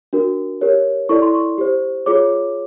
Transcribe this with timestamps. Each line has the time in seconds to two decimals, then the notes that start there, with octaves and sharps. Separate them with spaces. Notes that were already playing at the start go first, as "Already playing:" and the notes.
0.13 D4 F#4 A#4
0.61 G4 A#4 C#5
1.09 E4 A4 D5 C#6
1.22 C6
1.35 C#6
1.58 G4 C5
2.06 F4 G#4 C#5 D6